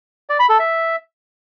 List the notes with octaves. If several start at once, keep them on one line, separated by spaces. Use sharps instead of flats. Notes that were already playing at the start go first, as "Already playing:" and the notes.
D5
B5
A4
E5